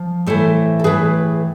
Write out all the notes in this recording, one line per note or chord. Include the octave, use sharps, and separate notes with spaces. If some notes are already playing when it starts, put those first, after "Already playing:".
Already playing: F3
A2 E3 A4 C5
A4
A2 E3 G#4 B4